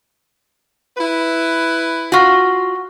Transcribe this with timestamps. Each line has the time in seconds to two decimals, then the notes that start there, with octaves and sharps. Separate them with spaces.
0.97 E4 B4
2.12 F4 F#4 F#5 C#6 A#6